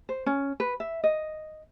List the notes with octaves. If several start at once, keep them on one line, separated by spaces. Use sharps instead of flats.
C5
C#4
B4
E5
D#5